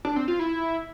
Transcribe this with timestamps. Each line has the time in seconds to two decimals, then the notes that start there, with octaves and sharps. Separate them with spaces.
0.05 D4
0.16 C4
0.28 F4
0.39 E4